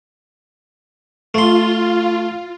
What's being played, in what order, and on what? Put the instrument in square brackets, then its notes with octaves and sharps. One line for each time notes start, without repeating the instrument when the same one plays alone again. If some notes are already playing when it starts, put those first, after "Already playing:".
[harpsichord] A3 C6 [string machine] F4